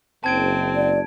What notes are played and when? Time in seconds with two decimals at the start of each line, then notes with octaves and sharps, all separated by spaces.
0.24 F#1 C4 A5 G#6 D7
0.75 D5